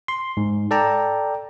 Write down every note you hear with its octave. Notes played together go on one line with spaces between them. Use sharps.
C6
G#2
A4 D5 G5 A5 A#5